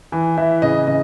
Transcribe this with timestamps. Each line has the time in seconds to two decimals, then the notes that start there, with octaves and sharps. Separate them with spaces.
0.12 E3
0.38 E3 E5
0.62 C#3 D#5
0.87 C#3 D#5